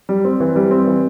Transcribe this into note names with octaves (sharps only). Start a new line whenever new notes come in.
G3
C4
E3
G3
C4
E3